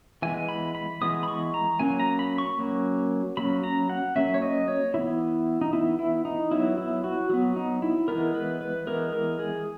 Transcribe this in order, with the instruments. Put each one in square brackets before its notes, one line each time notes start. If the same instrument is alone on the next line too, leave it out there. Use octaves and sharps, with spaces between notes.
[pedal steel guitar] E3 G#3 B3 G#5
B5
B5
E3 G#3 B3 D#6
B5
C#6
A#5
F#3 A#3 C#4 G#5
A#5
B5
C#6
F#3 A#3 C#4
F#3 A#3 C#4 B5
A#5
F#5
F#3 A#3 C#4 E5
C#5
D#5
C#5
E3 B3 E4
D#4
E3 B3 E4
E4
D#4
F#3 B3 E4
E4
F#4
F#3 B3
D#4
E4
E3 G#3 B3 A#4
B4
B4
E3 G#3 B3 A#4
A#4
G#4